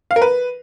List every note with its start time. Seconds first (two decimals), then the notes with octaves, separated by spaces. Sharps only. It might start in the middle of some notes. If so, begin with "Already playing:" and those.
0.11 F5
0.16 A#4
0.22 B4